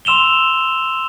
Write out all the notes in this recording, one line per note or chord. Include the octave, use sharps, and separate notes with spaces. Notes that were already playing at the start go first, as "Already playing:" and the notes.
C6 E6 E7 F7 G7